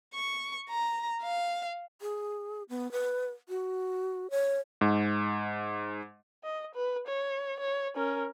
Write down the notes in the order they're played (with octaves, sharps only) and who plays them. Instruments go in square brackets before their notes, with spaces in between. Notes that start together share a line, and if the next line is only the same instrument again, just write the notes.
[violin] C#6
A#5
F5
[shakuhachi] G#4
B3
B4
F#4
C#5
[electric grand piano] G#2
[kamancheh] D#5
B4
C#5
C#5
C#4 A#4